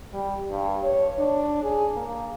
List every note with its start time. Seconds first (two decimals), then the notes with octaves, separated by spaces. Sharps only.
0.13 G3
0.50 G2
0.83 C#5
1.19 D4
1.63 G#4
1.96 A#3